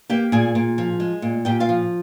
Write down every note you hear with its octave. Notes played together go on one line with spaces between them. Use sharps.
A#3 G4 G5
A#2 G#4 G#5
A#2
F3
G#3
A#2
A#2 G4 G5
F4 F5
F3